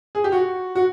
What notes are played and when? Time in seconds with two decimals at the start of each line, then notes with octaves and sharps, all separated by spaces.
0.15 G#4
0.24 G4
0.32 F#4
0.75 F#4